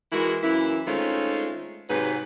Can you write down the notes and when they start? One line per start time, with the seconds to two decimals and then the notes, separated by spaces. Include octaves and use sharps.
0.12 E3 G#3 E4 F#4 A#4
0.42 F#2 E3 A#3 E4
0.87 D#3 G#3 A3 C4 C#4 F4
1.90 G#2 C3 F#3 B4